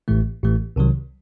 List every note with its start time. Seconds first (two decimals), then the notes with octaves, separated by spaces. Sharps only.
0.08 A1 A2 E3 A3
0.43 A1 A2 E3 A3
0.76 C2 C3 D#3 F#3